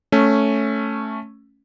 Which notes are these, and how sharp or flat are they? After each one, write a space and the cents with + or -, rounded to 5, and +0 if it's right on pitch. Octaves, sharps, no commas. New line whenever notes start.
A3 +0 C#4 +0